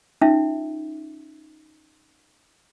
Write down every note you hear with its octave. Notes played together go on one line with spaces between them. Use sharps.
C#4 D#4 F4 E5